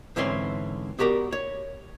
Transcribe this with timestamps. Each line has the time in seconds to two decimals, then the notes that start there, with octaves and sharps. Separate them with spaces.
0.16 G#2 D3 E3 C4 C#4 C6
0.99 B3 F#4 G4 A#4 D5
1.32 C#5